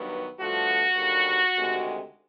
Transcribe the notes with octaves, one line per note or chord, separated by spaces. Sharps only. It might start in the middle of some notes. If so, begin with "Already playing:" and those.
Already playing: G2 D#3 F#3 B3
G2 D3 F3 A3 F#4
D#2 D3 G3 A#3
D2 C3 D#3 G#3